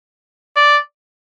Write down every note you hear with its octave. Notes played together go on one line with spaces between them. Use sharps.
D5